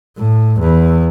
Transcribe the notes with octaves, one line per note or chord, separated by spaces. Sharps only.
A2
E2